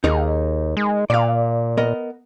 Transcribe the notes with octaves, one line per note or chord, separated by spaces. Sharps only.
D#2 D#4 G#4 A#4
G#3
A#2 D5 F5
B3 A#4 D#5